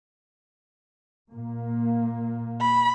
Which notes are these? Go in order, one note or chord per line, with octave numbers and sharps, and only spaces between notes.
A#2 A#3
B5